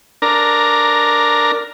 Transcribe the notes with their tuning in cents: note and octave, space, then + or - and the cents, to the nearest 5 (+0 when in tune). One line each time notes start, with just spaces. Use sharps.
D4 +0 A#4 +0 A#5 +15